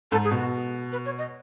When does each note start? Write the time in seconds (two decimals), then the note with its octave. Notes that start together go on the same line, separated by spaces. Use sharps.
0.12 G#2 A4
0.24 G#4
0.31 B2
0.38 F#4
0.92 B4
1.05 C#5
1.18 D#5